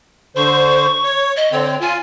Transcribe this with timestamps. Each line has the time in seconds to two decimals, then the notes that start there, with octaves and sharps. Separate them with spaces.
0.36 D3 C5 C#6
1.04 C#5
1.36 D#5
1.52 D3 C4 C#5
1.81 F4 G#5